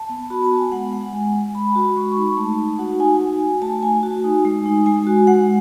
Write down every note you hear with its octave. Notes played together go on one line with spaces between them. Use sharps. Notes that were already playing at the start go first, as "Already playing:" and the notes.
Already playing: A5
B3
F#4 B5
A5
B3
G#5
G#3 F#5
G#3 F#5
G#3 G#5
G#3
G#3 B5
F#4
G#3 C#6
C#6
D#4 B5
A3 A5
D#4
F#4 F#5
D#4 G#5
F#4
F#4
A3 A5
A3 G#5
F#4
D#4
G#3
D#4
G#3 G#5
F#4
G#3 F#5